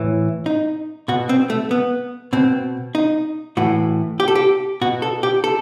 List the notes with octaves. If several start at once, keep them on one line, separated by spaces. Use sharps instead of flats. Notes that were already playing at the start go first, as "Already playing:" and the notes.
Already playing: A2 E3
D#4
B2 F#4
C4
A3
B3
B2 C4
D#4
A2 E3 F#4
G4
A4
G4
B2 F#4
A4
G4
A4